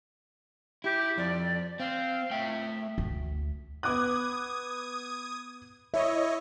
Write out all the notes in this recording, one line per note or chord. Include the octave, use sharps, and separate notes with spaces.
E4 G4
F2 D5
C4 F5
A3 E5 G5
D2
B3 D6 D#6 F#6 G#6
E4 C#5 D#5 E5